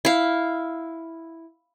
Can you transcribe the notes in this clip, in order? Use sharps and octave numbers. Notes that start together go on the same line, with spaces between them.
E4 F5